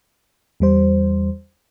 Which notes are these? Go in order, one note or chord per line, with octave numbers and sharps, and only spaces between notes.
E2 G3 C5